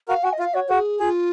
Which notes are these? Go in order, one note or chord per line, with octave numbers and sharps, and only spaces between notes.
F#4 A#4 F5
F#4 G#5
D#5
F4 F5
F#4 C#5
F#4 G#4
F4 G#4